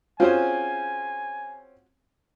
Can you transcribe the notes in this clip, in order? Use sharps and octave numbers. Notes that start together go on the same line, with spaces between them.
C4 C#4 F4 F#4 G#4 C5 G#5